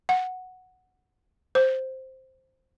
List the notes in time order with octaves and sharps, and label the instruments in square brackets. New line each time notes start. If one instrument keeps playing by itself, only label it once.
[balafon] F#5
C5